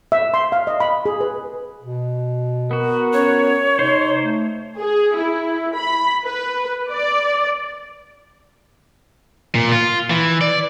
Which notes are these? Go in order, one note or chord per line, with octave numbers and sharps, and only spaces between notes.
E5
C6
F5
D#5
B5
G#4
B4
B2
B3 F#4 A#4
C#4 C#5
C3 D#4 C5
A3
G#4
E4
B5
B4
D5
A#2
F4
E3
D5